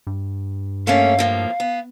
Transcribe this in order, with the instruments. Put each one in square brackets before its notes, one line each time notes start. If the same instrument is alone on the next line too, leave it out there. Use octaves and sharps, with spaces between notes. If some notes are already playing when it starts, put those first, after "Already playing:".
[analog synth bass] G2
[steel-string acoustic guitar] A3 A#3 C#4 [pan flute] F5
[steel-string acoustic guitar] A2 F3 A#3
B3